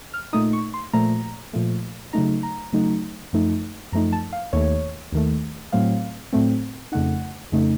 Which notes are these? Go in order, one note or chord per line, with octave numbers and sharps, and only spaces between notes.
F6
A#2 A3 D#4 D#6
C#6
C6
A#2 F3 A3 A#5
A#2 F3 A3
C#3 F#3 A3 D#4 A#5
A#5
C#3 F#3 A3 D#4
F#2 F3 A3 D#4
F#2 F3 A3 D#4 A#5
A5
F5
D#2 D#3 A3 C#5
D#2 D#3 A3
A2 F#3 A3 C4 F5
A2 F#3 A3 C4
F2 C#3 A3 D#4 F#5
F2 C#3 A3 D#4